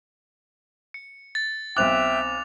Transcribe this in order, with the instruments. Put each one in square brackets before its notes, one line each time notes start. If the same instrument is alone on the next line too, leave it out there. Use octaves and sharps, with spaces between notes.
[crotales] C#7
A6
[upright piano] B1 C4 F#6 [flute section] E5 G5 [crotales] D6 A6 F7